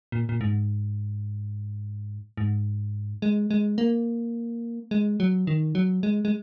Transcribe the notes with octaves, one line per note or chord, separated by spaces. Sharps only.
A#2
A#2
G#2
G#2
G#3
G#3
A#3
G#3
F#3
D#3
F#3
G#3
G#3